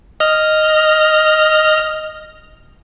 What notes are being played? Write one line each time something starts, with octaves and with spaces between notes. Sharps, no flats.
D#5 F6